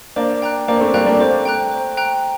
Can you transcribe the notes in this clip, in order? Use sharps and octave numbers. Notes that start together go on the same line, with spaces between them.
A#3 D4 C5
G5 A#5 F#6
A#3 D4 C5
A3 C4
G3 A#3 G5 A#5 F#6
A#3 D4
A3 C4 C5
G5 A#5 F#6
C5
G5 A#5 F#6